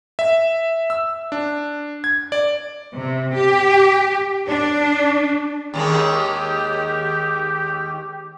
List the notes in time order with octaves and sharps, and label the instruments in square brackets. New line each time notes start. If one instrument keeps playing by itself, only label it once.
[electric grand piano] E5
E6
D4
G#6
D5
[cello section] C3
G4
D4
[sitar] D#2 D#3 G#3 [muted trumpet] G4